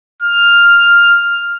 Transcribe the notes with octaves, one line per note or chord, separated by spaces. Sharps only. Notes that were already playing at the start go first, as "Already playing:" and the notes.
F6